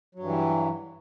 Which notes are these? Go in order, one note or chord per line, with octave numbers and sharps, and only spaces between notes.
G2 E3 F#3